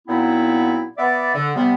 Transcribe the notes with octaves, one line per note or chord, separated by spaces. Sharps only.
A#2 F#3 B3 C4 D#4 E4
B3 D5 E5
D3
C3 G3 B3